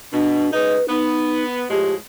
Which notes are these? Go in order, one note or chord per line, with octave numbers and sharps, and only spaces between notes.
B2 D4
C#3 G#3 D#4 B4
B3 D#4
A2 F3 G#3 G4